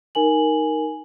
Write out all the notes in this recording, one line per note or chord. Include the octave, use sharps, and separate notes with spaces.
D#4 A#4 G#5 F#7